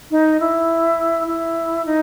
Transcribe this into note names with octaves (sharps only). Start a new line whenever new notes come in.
D#4
E4
E4
D#4